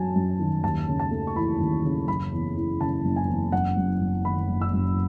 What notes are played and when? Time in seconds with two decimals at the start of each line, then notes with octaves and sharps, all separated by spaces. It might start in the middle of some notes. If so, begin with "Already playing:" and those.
Already playing: F#2 F#3 G#5 A5
0.16 F#2
0.39 D#3
0.63 D#2 A5
0.88 C#3
1.00 A5
1.11 A3
1.27 C#6
1.36 E3 B5
1.59 D#2
1.84 C#3
2.08 F#1 B5
2.32 E2
2.56 E3
2.80 C#3 A5
3.05 F#1
3.16 G#5
3.28 E2
3.52 F#1 F#5
3.77 F#2
4.00 F#1
4.25 D#3 B5
4.49 F#1
4.61 E6
4.73 F#2